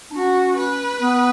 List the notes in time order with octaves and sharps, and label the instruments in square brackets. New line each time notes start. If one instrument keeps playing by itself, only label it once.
[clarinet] D4
[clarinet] C#4 [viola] F#4
[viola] B4
[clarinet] B3